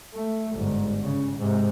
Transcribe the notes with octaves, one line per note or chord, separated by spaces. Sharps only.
A3
G1 G#2
C#3
G#2 C3